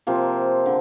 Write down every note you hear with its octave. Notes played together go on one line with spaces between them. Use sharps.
C3 F3 A#3
D3